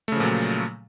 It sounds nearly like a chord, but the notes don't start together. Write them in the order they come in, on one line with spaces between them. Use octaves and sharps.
A3 C#3 F3 A#2 F#3